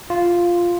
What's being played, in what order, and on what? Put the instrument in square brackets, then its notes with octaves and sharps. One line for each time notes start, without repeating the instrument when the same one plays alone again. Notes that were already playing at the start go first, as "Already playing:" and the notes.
[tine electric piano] F4